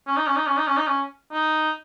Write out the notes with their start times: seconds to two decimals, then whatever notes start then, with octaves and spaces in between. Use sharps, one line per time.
0.07 C#4
0.17 D#4
0.27 C#4
0.36 D#4
0.47 C#4
0.58 D#4
0.67 C#4
0.77 D#4
0.87 C#4
1.32 D#4